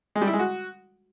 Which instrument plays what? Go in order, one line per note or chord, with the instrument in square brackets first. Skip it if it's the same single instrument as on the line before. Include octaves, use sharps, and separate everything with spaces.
[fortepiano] G#3
G3
E4
G#3
F#4